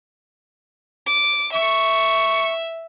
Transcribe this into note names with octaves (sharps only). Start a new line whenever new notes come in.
D6
E5 C#6